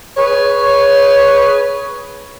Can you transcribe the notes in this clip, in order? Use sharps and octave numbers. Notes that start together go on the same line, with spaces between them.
G#4 B4 C#5